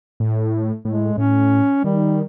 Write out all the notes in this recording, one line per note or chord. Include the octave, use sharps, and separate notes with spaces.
A2
A2 G#3
A2 C#4
D#3 G3